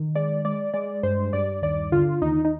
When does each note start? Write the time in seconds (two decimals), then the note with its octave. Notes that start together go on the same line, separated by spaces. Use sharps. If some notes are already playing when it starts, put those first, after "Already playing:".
Already playing: D#3
0.15 G#3 D5
0.45 G#3 D5
0.74 G#3 D5
1.03 G2 C5
1.33 G2 D5
1.62 D#2 D5
1.92 D3 F4
2.22 D#2 D#4
2.45 D#4